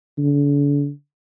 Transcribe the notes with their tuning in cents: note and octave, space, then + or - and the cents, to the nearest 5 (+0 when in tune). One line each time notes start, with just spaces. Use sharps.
D3 -40